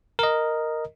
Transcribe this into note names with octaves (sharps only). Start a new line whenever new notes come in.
A#4 D#5